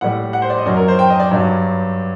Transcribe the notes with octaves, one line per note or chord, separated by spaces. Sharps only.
A2 G3 F#5
F#5
C5
D5
D#5
F#2 F#3 D5
A#4
C5
G5
D#5
D5
G2 F#3